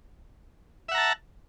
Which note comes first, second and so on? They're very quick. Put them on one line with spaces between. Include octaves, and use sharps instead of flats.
E5 F#5 A#5 A5